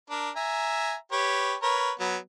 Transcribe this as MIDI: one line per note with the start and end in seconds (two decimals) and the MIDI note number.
0.10 0.30 62
0.10 0.30 70
0.36 0.95 76
0.36 0.95 80
0.36 0.95 82
1.12 1.55 67
1.12 1.55 71
1.12 1.55 73
1.63 1.92 70
1.63 1.92 71
1.63 1.92 73
2.00 2.17 54
2.00 2.17 59